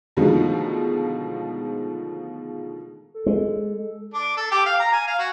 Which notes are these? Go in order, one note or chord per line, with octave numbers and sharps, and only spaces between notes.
B2 D3 D#3 F3 G#3 A3
A4
G#3
D4
A4
G4
F5
A#5
G#5
F5
F#4